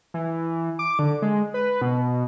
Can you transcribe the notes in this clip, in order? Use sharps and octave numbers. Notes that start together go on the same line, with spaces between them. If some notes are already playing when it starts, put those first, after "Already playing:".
E3
D6
D3
G#3
B4
B2